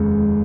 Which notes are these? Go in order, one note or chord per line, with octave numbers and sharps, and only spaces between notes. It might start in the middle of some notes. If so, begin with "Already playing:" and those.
Already playing: F1 D#2 C#3 G#3